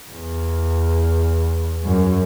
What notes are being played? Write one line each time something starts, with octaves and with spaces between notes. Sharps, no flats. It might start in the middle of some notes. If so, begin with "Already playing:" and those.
E2
F#2